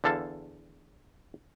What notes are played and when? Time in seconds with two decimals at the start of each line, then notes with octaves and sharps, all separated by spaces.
0.04 E2 D3 A4 F5 A5